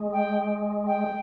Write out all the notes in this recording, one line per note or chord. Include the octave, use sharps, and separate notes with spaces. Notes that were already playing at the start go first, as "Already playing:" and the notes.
Already playing: G#3
G5
G5